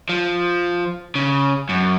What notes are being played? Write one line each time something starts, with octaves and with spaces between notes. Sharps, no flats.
F3
C#3
F#2